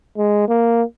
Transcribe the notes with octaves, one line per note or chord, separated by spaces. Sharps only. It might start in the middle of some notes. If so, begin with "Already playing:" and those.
G#3
A#3